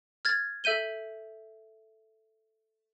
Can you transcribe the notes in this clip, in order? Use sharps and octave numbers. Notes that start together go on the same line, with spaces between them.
F6 G#6 A6
A4 E5 G6 D#7 G7